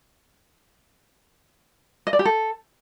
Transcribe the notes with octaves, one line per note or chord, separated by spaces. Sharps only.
D#5
D5
G4
A4